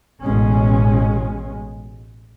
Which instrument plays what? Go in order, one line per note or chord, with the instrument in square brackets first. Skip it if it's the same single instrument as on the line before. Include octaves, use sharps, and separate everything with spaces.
[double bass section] A1 B2 G#3 C#4